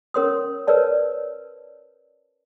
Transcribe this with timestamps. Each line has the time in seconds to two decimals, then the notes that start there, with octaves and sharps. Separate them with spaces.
0.14 C#4 A#4 C#5 C6 D#6
0.67 A#4 B4 C#5 D5 A5